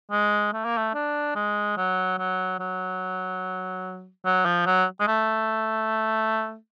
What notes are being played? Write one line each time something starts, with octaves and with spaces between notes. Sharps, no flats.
G#3
A3
A#3
A3
D4
G#3
F#3
F#3
F#3
F#3
F3
F#3
G#3
A3